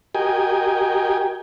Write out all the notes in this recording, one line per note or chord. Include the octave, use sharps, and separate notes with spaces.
F#4 G4 A#4 D#5 G5 G#5